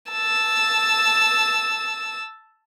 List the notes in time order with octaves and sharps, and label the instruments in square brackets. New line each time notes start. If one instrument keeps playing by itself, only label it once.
[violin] A5 E6